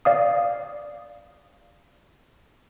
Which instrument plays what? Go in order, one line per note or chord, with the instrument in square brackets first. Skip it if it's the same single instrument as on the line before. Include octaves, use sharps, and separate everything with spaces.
[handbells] D5 F5 D#6